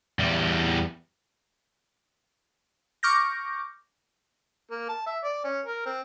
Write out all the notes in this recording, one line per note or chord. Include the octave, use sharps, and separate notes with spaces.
E2 G3
C#6 D6 F6 G6 A#6
A#3
A5
E5
D5
C#4
A#4
C4